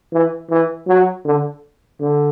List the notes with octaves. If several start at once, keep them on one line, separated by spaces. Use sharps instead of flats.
E3
E3
F#3
D3
D3